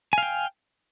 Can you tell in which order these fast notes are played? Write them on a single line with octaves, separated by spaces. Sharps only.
G#5 F5 G5